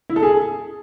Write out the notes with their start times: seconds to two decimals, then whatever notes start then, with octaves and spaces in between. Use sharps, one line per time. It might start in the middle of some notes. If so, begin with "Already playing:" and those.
0.10 E4
0.16 A4
0.23 G#4